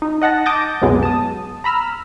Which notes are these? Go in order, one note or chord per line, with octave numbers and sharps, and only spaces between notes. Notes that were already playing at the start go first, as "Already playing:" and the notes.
D#4
D#5 F#5 A5 A#6
A5 D6 D#6 G6 A6 A#6
C2 F#2 B2 F#3 G#3 B3
A5 D#6
A#5 B5 E6 F6